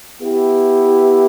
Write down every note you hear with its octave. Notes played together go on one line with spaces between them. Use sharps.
B3 E4 G4